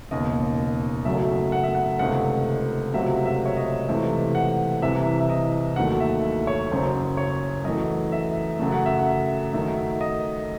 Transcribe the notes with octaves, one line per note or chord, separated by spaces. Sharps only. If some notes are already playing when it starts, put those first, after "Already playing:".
E1 D#2 C#3 D#5
F#1 F#2 C#3 F#3 A3 E5
F#5
E5
F#5
C#2 C3 D#3 A3 F#5
C#2 C3 F#3 A3 E5
E5
C#5
D#5
C#2 C3 E3 A3 E5
F#5
C2 C3 E3 E5
E5
D#5
D#2 D#3 F#3 A3 F#5
E5
C#5
F#1 F#2 C#3 C5
C#5
F#2 E3 A3 D#5
E5
F#2 C#3 F#3 A3
F#5
E5
F#5
F#2 D#3 F#3 A3 E5
D#5